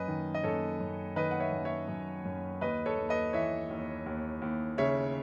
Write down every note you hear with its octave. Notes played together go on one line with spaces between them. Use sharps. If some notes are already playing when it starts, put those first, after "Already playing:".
Already playing: F#2 B4 D#5
D#3
D#5
F#2 A4 C#5
F#2
D#3 B4 D#5
F#5
C#5 E5
F#2
C#5 E5
F#2
F#2
D#2 B4 D#5
A4 C#5
D#2
B4 D#5
E3 C#5 E5
D#2
D#2
D#2
C#3 C#5 E5